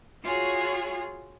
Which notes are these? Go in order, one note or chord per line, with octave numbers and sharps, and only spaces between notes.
F4 F#4 G#4 C#5